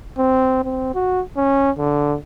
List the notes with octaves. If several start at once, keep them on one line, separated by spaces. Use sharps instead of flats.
C4
C4
F#4
C#4
D3